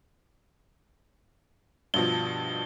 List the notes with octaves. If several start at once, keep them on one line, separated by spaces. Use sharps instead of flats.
G2 B2 F3 G7